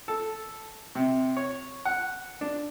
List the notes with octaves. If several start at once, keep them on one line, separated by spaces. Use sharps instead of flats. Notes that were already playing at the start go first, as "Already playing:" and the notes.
A4
C3
C#5
F#5
D4